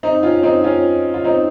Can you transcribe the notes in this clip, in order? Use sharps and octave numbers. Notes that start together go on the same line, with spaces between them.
C4 D#4
C#4 F4
C4 D#4
C#4 F4
F4
C4 D#4